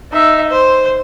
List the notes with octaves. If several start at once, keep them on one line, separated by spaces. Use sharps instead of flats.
D#4 E5
C5